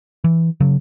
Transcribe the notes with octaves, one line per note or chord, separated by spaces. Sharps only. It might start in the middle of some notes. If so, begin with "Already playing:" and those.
E3
C#3 F#3